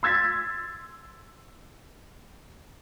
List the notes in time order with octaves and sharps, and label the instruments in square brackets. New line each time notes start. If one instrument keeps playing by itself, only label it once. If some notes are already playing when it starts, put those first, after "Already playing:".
[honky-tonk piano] C6 E6 G#6 A6 B6